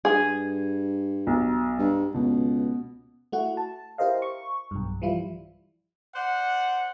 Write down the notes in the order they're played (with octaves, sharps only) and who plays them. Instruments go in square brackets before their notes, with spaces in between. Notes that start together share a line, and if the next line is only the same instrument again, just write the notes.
[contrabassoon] G2 [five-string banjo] G#4
[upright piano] B1
[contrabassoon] G2
[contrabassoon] C#2 [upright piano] B2
[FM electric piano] A3 E4 F#4 F#5
A5
E4 G4 A#4 C5 D#5 F5
C#6
B1 G2
E3 F3 G3 E4 F4
[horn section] C5 D5 F#5